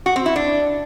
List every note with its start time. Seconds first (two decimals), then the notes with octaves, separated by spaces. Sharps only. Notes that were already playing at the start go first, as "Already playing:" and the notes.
0.06 F#4
0.16 C4
0.26 E4
0.36 D4